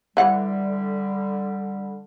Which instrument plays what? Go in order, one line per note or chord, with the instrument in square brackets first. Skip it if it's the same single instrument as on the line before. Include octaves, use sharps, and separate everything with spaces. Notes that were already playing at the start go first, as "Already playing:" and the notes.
[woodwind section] D3 G3 [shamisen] E3 F#5